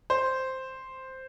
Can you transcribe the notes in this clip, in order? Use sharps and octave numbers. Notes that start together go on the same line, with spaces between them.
C5